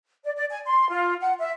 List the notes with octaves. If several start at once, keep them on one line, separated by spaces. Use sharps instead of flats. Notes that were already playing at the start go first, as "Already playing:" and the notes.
D5
D5
G#5
C6
F4
F#5
E5